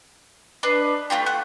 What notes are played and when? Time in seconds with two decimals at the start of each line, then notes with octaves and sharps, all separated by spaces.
0.63 D4 B4 D#5
1.10 A3 C4 F4 G4
1.26 F#5